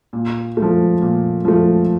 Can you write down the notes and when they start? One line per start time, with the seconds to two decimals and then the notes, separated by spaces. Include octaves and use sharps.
0.13 A#2
0.57 A3
0.62 F3
1.02 A#2
1.45 F3 A3